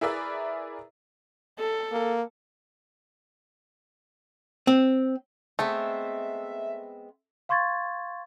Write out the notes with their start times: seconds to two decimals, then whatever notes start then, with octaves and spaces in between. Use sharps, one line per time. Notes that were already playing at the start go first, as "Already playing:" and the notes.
0.01 E4 G#4 A#4 B4 D5 E5
1.59 A4
1.92 A#3
4.67 C4
5.59 G#3 A3 B3 C4 E5
7.49 F5 C6 C#6 G#6 A6